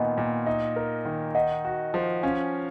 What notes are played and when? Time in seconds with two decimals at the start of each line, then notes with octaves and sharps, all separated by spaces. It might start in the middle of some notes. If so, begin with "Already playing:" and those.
Already playing: A#2 D#3 B3 D#5 F#5 G#5
0.18 A#2
0.46 D#4
0.76 A#4
1.05 D#3
1.35 D#4 D#5 F#5
1.65 F#4
1.94 F3
2.23 C#4 F5 G#5